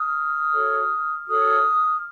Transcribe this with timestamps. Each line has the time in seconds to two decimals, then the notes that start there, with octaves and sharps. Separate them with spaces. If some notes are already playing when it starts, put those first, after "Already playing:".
Already playing: D#6 F6
0.52 F#4 A4 C#5
1.28 F#4 A4 C#5 D#6 F6